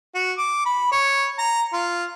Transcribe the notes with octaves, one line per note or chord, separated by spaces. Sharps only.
F#4
D6
B5
C#5
A#5
F4